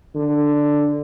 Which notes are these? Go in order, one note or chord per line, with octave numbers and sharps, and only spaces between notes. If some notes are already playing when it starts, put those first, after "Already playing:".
D3